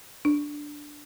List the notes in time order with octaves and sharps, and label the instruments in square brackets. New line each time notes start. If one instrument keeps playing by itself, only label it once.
[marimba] D4